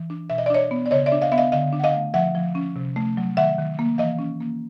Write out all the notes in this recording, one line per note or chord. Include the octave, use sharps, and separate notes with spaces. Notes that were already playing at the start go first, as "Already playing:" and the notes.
Already playing: E3
D4
B2 E5
D#5
D5
D4 C#5 D#5
B3
D5
C#3 C#5 D#5
D5 E5
D4
D#5 F5
B3 E5
D#5 F5
D3 D#5 F5
D4
F#5
D#5 F5
A3
F3 E5 F#5
F3
C#4
C3
A3
F#3
D#3 E5 F#5
D#3
A#3
E3 D#5 F5
C#4
A#3